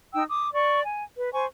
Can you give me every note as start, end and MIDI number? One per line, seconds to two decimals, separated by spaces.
0.12 0.23 63
0.12 0.23 79
0.12 0.23 88
0.30 0.51 86
0.30 0.51 87
0.54 0.82 74
0.54 0.82 85
0.84 1.04 80
1.16 1.32 71
1.32 1.45 72
1.32 1.45 80
1.32 1.45 85